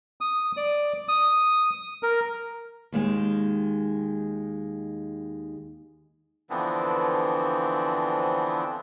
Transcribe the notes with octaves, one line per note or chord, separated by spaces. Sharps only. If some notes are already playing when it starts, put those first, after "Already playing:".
D#6
D5
D#6
A#4
D#2 D#3 G#3
D3 E3 F3 B3 C4 D4